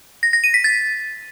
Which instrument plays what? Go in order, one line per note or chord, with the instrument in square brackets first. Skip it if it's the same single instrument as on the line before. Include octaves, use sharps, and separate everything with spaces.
[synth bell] A#6
A#6
D#7
B6
A6